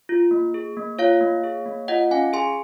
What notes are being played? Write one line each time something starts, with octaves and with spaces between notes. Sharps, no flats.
F4
A#3
G#4
A#3
F4 C#5 F5
A#3
G#4
A#3
F4 D#5 F#5
C#4 F5 G#5
G#4 G#5 C6